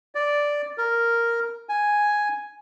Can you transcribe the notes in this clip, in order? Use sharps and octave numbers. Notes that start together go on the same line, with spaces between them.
D5
A#4
G#5